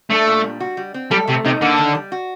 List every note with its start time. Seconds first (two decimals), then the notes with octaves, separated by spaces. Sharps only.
0.10 A3 D4
0.27 A#2
0.44 G3
0.60 F#4
0.77 G3
0.94 C4
1.11 G3 A4
1.27 C3 A3
1.45 C3 D#4
1.61 D3 A#3
1.78 D#3
1.95 G3
2.12 F#4